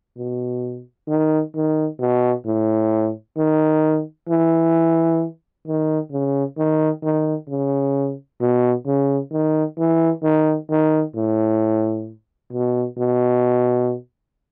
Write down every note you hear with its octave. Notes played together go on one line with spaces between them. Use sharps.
B2
D#3
D#3
B2
A2
D#3
E3
D#3
C#3
D#3
D#3
C#3
B2
C#3
D#3
E3
D#3
D#3
A2
B2
B2